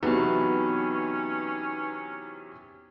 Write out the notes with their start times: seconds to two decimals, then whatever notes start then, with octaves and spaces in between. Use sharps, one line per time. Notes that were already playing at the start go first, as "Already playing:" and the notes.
0.03 E2 C3 F#3 B3 C#4 D#4 B4